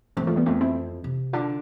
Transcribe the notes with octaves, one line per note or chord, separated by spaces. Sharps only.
E2 A3 C4
F3 A3
G3 B3
F2 A3 C4
C4 E4
C3
D3 D4 F4